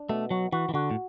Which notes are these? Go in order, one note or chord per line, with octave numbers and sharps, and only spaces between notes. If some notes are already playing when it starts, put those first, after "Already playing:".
Already playing: D4
B2 A3
F#3 F#4
E3 F#4
E3
D3 F#4
A2